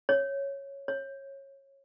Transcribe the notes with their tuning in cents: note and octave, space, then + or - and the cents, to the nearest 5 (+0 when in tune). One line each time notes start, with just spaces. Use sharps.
C#5 -5
C#5 -20